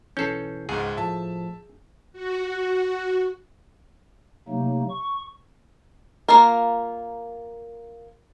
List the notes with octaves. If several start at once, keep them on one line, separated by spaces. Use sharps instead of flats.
B1 E3 C#4 A4 G6 C7
C#2 G#2 G#4 F#5 C6
A2 F3 A3 E5 A5
F#4
C3 F#3 A3 A#3 D#4
C#6
A#3 F4 A#4